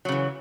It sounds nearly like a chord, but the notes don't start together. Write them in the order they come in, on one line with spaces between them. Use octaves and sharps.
F#3 C#3 E3